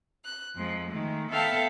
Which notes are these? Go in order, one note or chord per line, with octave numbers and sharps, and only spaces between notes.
F#6
F2 F3 G#3
D#3 G#3 A3
B3 A4 E5 F5 G5 A5